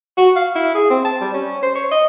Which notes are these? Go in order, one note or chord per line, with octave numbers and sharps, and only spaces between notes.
F#4
F5
E4
G#4
C4
A5
G3
C#4
C5
C#5
D#5